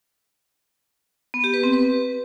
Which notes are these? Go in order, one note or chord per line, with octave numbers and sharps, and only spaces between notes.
B3
G4
B4
C4
B4